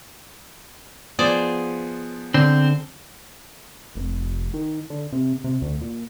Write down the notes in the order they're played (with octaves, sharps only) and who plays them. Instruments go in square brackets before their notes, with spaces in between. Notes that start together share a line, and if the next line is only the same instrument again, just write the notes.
[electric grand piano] F3 B3 [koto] G#4 C5 D5
[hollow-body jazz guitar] D3 [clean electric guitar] C4
[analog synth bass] F1
D#3
D3
C3
C3
D2
A#2